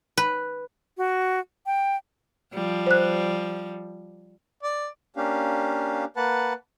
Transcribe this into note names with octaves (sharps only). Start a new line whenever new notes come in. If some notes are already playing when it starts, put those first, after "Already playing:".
B4
F#4
G5
F3 G3
C5 F#6
D5
A#3 C#4 D4 G4 F5
A#3 B4 F#5 A5